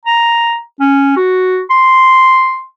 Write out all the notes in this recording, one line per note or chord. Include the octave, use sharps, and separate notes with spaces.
A#5
C#4
F#4
C6